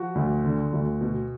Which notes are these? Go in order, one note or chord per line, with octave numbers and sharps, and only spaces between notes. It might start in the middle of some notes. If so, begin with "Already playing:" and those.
Already playing: F3 F#4
D2
D3
D2
B2